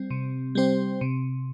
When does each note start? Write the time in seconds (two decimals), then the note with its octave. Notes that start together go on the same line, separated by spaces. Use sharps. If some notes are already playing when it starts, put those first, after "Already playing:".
Already playing: G3 C4
0.11 C3
0.55 G3 C4 G4 C5
1.01 C3